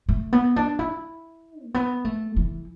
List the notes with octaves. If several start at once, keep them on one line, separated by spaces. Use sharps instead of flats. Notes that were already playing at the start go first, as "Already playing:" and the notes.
A3
B3
D4
E4
A3
B3
A3
E3